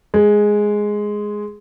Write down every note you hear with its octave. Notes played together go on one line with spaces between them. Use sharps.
G#3